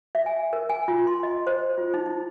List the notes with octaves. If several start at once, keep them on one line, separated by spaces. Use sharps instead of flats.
E5
G#5
A#4
G#5
F4
C6
D#5
C5
F4
D#4
E4